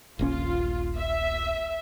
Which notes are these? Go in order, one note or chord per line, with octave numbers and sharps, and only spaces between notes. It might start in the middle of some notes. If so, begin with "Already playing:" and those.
D#1 A#1 C#4 F4
E5